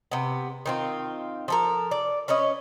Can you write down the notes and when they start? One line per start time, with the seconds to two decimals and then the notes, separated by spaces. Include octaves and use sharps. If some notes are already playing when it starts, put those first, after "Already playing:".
0.12 C3 B3
0.66 D#3 C4 F4
1.48 F3 A4 A#4
1.91 D5
2.28 C#4 B4 C#5 D#5